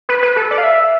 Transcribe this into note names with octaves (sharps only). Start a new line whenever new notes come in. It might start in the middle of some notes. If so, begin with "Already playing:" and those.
B4
B4
A4
D5
F5
E5